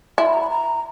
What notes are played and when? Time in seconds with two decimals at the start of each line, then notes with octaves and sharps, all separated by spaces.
0.18 E4 C6
0.26 B5
0.33 A#5
0.41 B5
0.50 A#5